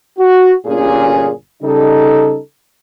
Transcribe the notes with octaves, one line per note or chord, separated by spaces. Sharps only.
F#4
G1 A#2 C#4 G#4
C#3 G3 D#4 A4